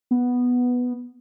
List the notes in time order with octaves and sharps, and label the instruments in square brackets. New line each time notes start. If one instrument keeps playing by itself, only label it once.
[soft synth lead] B3